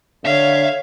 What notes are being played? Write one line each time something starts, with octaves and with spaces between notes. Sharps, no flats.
D3 C#5 E5 F5